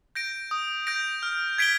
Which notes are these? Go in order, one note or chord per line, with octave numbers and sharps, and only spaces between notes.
G6 A#6 D7
D#6
G6 A#6 D7
F6
G#6 B6 D7 G7